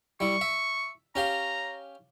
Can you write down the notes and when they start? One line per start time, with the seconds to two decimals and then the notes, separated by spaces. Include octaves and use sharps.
0.20 G3 E4 C#6
0.41 E5
1.15 C#4 G4 F5 A#5